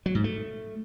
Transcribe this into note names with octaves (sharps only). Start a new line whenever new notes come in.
F#3
G#2
A3